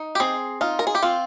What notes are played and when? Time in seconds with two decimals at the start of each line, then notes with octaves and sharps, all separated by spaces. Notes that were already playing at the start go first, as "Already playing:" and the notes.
Already playing: D#4
0.15 G4
0.20 C4 G#4
0.61 D#4 F4
0.79 A#4
0.87 G#4
0.95 G4
1.02 C4 F4